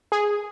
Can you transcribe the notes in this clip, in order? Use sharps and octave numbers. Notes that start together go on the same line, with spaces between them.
G#4